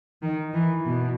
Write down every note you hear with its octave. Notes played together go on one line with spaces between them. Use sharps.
D#3
E3
B2